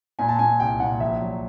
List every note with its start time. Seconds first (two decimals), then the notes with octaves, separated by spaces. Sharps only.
0.19 A#2 G#5
0.29 A5
0.39 A#2 G#5
0.60 C2 G5
0.80 A#2 F#5
1.00 A#1 E5
1.21 F#3